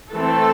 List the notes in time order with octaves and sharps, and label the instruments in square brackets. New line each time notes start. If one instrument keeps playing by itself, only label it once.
[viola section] E3 A3 C4 A4